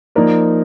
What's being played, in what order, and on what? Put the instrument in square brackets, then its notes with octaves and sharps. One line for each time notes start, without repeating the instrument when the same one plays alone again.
[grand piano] F3 A#3 D#4 A#4 D5